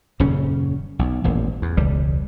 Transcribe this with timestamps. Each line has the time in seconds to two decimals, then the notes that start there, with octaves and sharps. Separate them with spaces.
0.20 D#1 F#2 C#3 C#4
0.99 B1
1.24 D#1 A1
1.62 E2
1.77 E1 C#2 G3